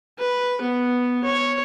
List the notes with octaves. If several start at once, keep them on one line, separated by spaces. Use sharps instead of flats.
B4
B3
C#5